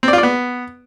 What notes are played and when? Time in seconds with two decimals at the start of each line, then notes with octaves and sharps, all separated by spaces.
0.03 C4
0.08 D5
0.13 F4
0.18 D5
0.23 B3